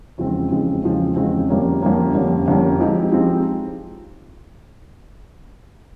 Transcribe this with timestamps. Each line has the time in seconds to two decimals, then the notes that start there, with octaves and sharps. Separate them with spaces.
0.18 E2 C#3 F3 G#3 C4
0.51 E2 C#3 F3 G#3 C4
0.84 E2 C#3 F3 G#3 C4
1.16 E2 C#3 F3 G#3 C4
1.49 F2 D3 G3 A#3 C#4
1.81 F2 D3 G3 A#3 C#4
2.14 F2 D3 G3 A#3 C#4
2.48 F2 D3 G3 A#3 C#4
2.80 F3 G#3 C4 D#4 G4
3.12 F3 G#3 C4 D#4 G4